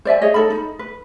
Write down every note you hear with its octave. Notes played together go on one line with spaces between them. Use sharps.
C5 D5 E5 G#5
G#4 C#5 D#5
D#4 A4 A#4 B5
D#4
B4